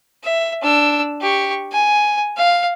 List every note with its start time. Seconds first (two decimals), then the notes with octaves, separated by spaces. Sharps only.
0.24 E5
0.63 D4 E6
1.21 G4 C#6
1.72 G#5
2.37 F5